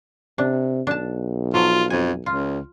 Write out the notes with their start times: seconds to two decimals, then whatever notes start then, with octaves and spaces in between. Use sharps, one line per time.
0.38 C3 D4
0.87 B1 D4 A5
1.54 F3 F#3 F4
1.90 F2 G#5
2.26 C#2 F4